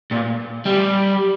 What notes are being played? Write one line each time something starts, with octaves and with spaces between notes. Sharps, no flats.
A#2
G3